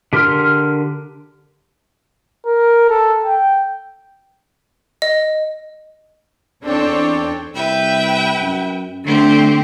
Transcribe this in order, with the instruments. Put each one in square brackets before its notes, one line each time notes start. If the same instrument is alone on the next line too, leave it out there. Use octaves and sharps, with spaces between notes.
[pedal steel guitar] D3 G4 A#4 C6 F6
[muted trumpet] A#4
A4
G5
[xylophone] D#5
[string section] E2 C4 D4 A4 C#5 G5
[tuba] C2 [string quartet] B4 E5 G5
[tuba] F#2
[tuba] D3 [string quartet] A3 C4 G4